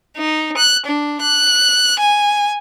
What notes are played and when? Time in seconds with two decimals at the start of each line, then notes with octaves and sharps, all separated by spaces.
0.17 D#4
0.57 F#6
0.86 D4
1.22 F#6
2.00 G#5